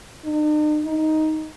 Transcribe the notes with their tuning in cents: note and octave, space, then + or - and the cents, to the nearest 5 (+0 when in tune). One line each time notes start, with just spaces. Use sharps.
D#4 -45
D#4 +5